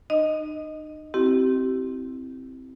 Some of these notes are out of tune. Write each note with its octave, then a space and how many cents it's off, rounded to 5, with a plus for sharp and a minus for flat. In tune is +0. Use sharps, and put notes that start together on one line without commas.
D#4 -40 D#5 +0
C4 +0 E4 +0 G4 -30